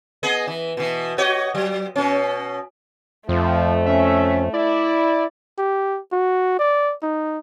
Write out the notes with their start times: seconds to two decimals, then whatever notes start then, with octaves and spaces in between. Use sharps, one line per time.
0.23 B3 G#4 D#5
0.47 E3
0.77 B2 E3
1.18 F#4 C#5 D#5
1.55 F#3
1.96 B2 C#4
3.29 F2 F3 A3
3.86 C#4 E5
4.54 E4 D5
5.58 G4
6.12 F#4
6.59 D5
7.03 D#4